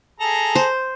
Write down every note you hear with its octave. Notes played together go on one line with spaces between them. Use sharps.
G#4 A4 A#5
C5